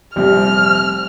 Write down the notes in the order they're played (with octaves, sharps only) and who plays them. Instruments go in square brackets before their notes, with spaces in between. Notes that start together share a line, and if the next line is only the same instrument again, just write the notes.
[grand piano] F1 A#1 C4 [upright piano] G3 [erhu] F6